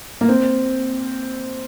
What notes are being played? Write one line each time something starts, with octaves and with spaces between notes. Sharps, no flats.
A#3
C4